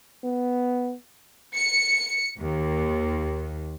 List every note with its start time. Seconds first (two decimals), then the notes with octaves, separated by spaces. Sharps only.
0.24 B3
1.54 C#7
2.39 D#2